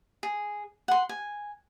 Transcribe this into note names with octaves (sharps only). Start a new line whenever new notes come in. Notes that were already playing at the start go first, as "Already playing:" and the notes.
G#4
F#5 C6
G#5